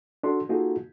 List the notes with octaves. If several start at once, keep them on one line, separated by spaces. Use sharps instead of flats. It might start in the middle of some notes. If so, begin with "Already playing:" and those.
D4 F#4 A4 C6
A#3 D#4 F4 F#4 G#4 A4